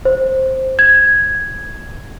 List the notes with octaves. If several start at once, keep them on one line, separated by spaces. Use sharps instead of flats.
C5
G#6